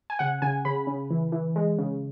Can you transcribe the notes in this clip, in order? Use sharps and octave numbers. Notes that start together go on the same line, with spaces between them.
G#5
C#3 F#5
C#3 G#5
C#3 B5
C#3
E3
E3
G#3
C#3